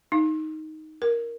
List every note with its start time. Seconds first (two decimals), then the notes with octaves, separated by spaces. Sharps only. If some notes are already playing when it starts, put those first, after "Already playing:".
0.12 D#4
1.02 A#4